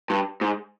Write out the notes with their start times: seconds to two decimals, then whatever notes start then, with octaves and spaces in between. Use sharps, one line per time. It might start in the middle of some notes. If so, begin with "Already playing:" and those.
0.10 G2
0.41 G#2